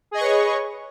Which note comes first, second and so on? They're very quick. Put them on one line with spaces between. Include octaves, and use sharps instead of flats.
G#4 D#5 C#6 B4 C#5